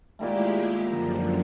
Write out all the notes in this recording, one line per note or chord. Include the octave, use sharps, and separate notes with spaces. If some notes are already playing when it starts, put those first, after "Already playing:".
A#2 D#3 G#3 A3 E4 G4
F#2 D3 F3 A#5